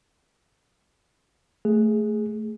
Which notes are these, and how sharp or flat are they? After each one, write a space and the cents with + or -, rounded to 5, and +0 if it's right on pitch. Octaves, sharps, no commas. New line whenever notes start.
A3 +0 G#4 +0